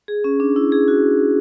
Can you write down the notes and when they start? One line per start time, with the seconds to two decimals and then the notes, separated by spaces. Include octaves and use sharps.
0.08 G#4
0.24 C#4
0.40 D4
0.56 E4
0.72 G#4
0.88 F#4